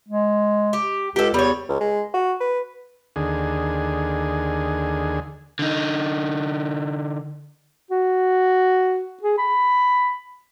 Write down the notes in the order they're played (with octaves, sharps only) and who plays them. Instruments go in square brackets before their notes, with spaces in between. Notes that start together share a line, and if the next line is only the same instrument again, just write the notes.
[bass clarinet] G#3
[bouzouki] G4
[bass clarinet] C#2 [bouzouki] G4 A4
[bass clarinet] E2 [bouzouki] G3 C#5
[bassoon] C#2
G#3
F#4
B4
[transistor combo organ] D#2 D3 G#4
[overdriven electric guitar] D3 D#4
[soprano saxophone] F#4
G#4
B5